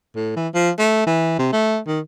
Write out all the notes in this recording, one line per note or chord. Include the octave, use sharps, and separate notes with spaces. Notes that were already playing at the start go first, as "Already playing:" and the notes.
A2
E3
F3
A3
E3
C3
A3
D#3